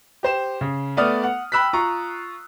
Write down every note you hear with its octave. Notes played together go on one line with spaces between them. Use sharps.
G4 C5 E7
C#3
A3 B3 D5 D#6 F6
F#5
G5 B5 E6 F#6 B6
F4 A#5 C#6